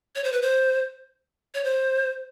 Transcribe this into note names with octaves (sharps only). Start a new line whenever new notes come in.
C#5
C5
B4
C5
C#5
C5